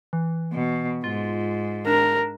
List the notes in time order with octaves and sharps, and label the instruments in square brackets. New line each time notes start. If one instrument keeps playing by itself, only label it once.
[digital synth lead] E3
[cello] B2
[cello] G#2 [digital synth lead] F4
[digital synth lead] D4 [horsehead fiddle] A#4